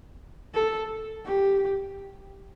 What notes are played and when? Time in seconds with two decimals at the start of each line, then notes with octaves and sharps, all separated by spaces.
0.55 A4
1.25 G4